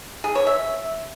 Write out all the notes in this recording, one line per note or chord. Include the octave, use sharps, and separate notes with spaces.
G#4
C#5
E5